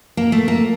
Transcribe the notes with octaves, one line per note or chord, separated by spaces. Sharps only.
A#3
A3
A#3